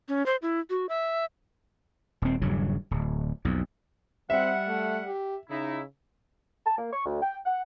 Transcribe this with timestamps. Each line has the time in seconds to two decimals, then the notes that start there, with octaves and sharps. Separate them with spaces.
0.09 C#4
0.26 C5
0.42 E4
0.70 F#4
0.89 E5
2.22 D#1 C4
2.42 D#1 G2 C#3 F#3
2.91 D1
3.45 B1 F2
4.30 G3 C4 E5 F#5
4.68 A3
5.07 G4
5.50 C#3 D#4 E4
6.66 A5
6.78 A#3
6.92 C#6
7.06 D2
7.22 G5
7.46 F#5